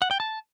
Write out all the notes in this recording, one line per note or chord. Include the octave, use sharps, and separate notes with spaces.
F#5
G5
A5